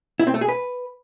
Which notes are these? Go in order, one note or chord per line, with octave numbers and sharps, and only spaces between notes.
E4
C4
A3
G#4
B4